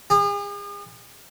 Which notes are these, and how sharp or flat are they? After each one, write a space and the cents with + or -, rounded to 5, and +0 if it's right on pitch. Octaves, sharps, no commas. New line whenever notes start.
G#4 -40